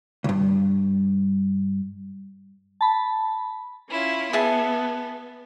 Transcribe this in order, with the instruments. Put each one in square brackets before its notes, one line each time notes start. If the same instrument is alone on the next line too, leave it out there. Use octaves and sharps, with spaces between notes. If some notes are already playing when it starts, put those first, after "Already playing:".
[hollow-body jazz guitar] C#2 G2
[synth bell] A5 B5
[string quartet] C#4 E4 F4
[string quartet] B3 [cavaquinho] G#4 E5 A5